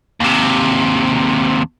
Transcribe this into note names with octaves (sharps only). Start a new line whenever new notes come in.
D#2 C3